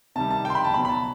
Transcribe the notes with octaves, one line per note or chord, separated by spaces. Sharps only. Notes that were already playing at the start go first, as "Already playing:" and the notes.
C3 D#3 G3 A5
A5
G5
C6
B5
A5
B2 F#3 B5
B5
A5